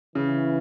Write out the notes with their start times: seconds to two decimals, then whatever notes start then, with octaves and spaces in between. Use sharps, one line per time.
0.15 C#3 E3